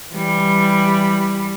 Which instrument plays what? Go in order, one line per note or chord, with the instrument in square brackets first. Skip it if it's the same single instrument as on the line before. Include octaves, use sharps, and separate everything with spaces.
[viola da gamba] E3 G3